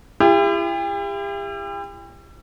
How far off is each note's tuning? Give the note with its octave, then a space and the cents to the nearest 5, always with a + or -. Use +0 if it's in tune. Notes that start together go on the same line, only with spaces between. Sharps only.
E4 +40 G4 +40